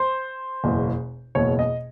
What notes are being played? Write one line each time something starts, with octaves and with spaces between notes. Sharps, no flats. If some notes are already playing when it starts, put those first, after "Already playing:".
Already playing: C5
F#1 E2 B2
F#1 E2 B2 C#5
D#5